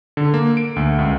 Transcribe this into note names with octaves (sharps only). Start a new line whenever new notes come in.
D3
A#3
D7
D2
C#2